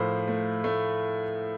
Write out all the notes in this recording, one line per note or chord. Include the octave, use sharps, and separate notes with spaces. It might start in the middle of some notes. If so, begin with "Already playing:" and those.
Already playing: A2 F3 A3 A#4 C5
A3
A3